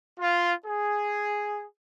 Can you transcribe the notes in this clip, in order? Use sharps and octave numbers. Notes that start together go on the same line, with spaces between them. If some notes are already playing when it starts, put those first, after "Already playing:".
F4
G#4